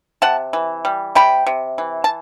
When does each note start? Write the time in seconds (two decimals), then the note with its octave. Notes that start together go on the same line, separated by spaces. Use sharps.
0.22 C3 F#5 A5
0.53 E3
0.85 G3
1.15 C3 G5 B5
1.47 C3
1.78 E3
2.04 A5